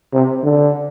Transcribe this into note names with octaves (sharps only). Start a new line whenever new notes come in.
C3
D3